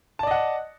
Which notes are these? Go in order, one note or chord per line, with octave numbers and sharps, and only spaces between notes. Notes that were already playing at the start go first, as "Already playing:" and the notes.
D5 D#5 F#5 A5